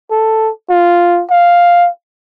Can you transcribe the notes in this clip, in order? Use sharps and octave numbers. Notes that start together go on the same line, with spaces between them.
A4
F4
F5